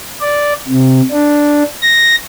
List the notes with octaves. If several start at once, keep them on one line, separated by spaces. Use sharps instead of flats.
D5
C3
D4
A#6